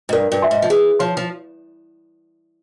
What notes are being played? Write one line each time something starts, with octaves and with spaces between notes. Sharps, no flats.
G#2
G2 A#4
G2
E5 G#5 C6
G#2
F3
E3 G#4
F3 C#5 F5 C6
F3